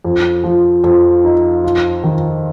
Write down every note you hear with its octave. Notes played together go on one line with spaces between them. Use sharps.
F2
F3
F2
D#4
F4
D#3